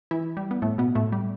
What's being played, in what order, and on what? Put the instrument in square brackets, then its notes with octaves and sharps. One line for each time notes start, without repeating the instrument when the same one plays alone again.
[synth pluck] E3 E4
G3
B3
A2 A3
B2 B3
A2 A3
G3